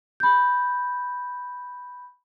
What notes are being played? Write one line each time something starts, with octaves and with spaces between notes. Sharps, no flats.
B5 G6